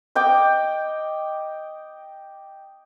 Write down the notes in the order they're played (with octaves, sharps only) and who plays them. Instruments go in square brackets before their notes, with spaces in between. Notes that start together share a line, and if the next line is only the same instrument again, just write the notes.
[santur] D#5 G5 D6